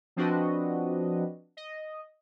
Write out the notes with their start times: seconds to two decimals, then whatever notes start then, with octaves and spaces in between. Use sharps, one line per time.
0.16 F3 C4 D4 F#4 B4 D#5
1.57 D#5